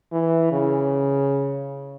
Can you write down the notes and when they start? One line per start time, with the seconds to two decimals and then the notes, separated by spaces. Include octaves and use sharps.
0.12 E3
0.52 C#3